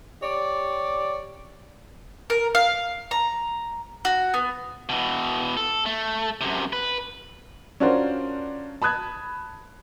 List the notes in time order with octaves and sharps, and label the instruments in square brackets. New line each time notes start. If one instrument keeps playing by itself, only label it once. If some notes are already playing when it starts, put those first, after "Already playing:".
[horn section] G4 C#5 D5
[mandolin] A#4
F5
A#5
F#4
B3
[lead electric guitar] B2 E3
A4
A3
F#2 C3
B4
[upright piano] C#4 D4 F4 F#4 A#4 C5
A5 B5 D#6 F#6 G#6